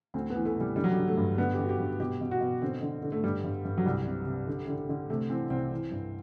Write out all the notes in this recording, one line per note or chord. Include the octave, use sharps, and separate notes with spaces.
D2 C4
B3
E3
A3
C3 G3
D3 G3
F#3
G3
D3
A3
G2
D3 B3
D3 G4
F#4
G4
G2
B2 G4
B2
F#4
B2
D3 C4
D3
D3
A3
G2 G3
G2
G2
F#3
C2 G3
C3
C3
D3
D3
D3
C3 A3
E3 C4
C2 C4
E3
G2